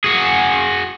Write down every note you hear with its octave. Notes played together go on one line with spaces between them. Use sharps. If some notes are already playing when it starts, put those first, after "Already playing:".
F#4 G#4